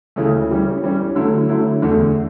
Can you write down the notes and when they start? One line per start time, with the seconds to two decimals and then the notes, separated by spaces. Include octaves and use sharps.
0.16 D2 C#3 E3 A3
0.49 E3 G3 C#4
0.83 E3 G3 C#4
1.15 D3 F#3 A3 E4
1.49 D3 F#3 A3 E4
1.82 E2 D3 A3